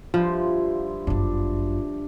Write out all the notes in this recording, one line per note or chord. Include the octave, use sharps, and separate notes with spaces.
G2 F3 E4 F4 C6
G1 F#2 D4